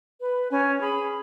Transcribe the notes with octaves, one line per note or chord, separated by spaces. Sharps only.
B4
C#4 G#5
G#4 B5